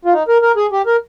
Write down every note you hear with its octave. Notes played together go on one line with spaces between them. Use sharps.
F4
D#4
A#4
A#4
G#4
G4
A#4